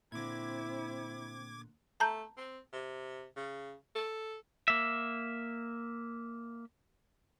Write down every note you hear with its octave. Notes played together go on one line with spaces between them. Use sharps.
A#2 D3 C4 E4 D6 G#6
A3 A5 A#5 G6
C4
C3
C#3
A4
A#3 E5